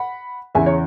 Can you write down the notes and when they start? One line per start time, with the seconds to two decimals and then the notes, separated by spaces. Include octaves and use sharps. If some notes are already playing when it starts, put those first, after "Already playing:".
Already playing: F#5 B5
0.55 E2 C#3 E3 E5 G#5
0.66 C#5